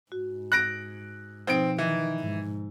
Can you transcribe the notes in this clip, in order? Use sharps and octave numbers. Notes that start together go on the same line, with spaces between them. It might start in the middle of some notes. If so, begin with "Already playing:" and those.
G#2 F#4
F#6 A#6 D7
B2 F3 C4 D#4 D7
D#3 E3
G#2